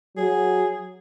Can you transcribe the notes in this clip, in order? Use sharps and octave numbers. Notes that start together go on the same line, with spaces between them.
F#3 G#4